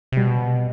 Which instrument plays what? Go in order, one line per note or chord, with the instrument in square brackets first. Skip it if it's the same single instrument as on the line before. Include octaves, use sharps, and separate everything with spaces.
[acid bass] C3
[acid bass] B2 [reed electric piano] G3